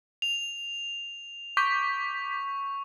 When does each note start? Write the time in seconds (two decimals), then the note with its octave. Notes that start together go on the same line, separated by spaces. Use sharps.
0.22 F7
1.57 C#6 D6 G6 B6